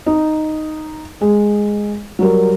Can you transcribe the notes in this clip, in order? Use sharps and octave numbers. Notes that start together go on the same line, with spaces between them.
D#4
G#3 G#4
F#3 G3 A#4